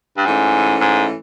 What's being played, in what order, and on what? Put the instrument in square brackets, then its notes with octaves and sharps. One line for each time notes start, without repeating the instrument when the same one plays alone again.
[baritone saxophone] G2
[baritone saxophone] G#2 [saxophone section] E3 A3 C#4
[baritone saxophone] G#2